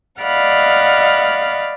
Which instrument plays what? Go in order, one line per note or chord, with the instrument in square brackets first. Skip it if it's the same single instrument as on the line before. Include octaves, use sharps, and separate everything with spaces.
[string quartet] D5 D#5 F5 F#5 B5